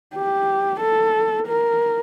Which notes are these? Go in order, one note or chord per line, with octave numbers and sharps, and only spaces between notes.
G4
A4
A#4